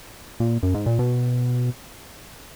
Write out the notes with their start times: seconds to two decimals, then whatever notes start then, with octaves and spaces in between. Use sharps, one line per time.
0.40 A#2
0.63 F#2
0.74 G#2
0.86 A#2
0.99 B2